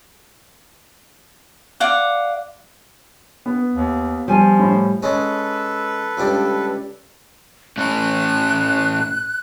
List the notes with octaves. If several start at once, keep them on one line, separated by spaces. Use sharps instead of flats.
D5 F5 F#5
B3
D#2
F3 G3 G#5
A2
G#3 C#4 A4 B4
C#2 G3 D4
A2 A3 C#4 F#6